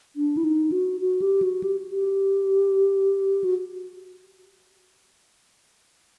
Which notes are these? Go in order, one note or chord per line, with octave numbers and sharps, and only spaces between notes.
D4
E4
D#4
F#4
F#4
G4
F#4
G4
G4
F#4